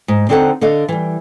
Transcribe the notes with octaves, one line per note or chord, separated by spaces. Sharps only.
G#2
D3 C4 D#4 A4 C5 F#5
D3 A4 D#5 F5
E3 G3